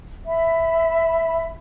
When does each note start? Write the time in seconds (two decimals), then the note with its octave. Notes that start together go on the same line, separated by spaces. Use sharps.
0.26 E5 B5